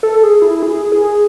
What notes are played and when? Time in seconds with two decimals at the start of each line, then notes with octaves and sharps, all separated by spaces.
0.03 A4
0.23 G#4
0.42 E4
0.63 G#4
0.92 G#4